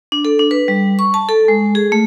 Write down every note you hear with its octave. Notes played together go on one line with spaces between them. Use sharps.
D4
A4
D4
B4
G3
C#6
A5
A4
G#3
G#4
A3